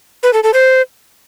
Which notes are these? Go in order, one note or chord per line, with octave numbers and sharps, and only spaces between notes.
B4
A4
A4
C5